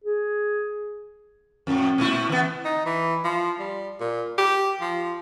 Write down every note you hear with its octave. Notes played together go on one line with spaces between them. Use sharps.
G#4
F2 A2
A#2 A3 E4
E3 B3
D#4
E3
F3
G3
A#2
G4
F3